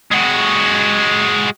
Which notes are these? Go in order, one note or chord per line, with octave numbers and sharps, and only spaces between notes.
G#3 F#4